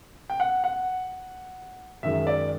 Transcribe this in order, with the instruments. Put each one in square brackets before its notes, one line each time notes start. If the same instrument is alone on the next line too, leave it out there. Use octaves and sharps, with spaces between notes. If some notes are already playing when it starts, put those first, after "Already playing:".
[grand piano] G5
F#5
F#5
F#2 D#3 G#3 E5
D5